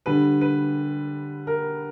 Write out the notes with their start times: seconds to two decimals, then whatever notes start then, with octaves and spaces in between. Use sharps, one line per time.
0.06 D3 G3 B4
0.41 B4
1.47 A#4